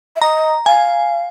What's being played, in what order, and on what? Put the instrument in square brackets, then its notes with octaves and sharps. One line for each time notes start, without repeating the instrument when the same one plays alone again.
[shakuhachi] E5
[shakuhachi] D#5 [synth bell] A#5
[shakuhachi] F5 [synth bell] G#5